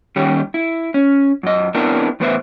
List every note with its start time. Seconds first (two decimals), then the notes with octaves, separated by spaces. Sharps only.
0.16 D#3 G3 C#4 G4
0.54 E4
0.94 C#4
1.43 F#2 D#5
1.75 B3 C4 D4 E4 A#4
2.20 E2 A2 B3 B4 C5 E5